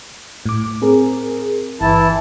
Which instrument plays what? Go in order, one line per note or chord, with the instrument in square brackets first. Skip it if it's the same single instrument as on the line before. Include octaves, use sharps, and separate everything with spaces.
[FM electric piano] A2 D6
C4 G#4 A#4
[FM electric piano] G1 [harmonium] E3 E4 A5